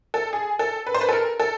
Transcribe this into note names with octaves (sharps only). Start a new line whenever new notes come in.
A4
G#4
A4
B4
C5
B4
A4
A#4
A4